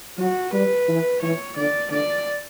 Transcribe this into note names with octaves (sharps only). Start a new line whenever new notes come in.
F#3 F#4
G3 B4
E3
E3 C#5
D3 D5
D3 D5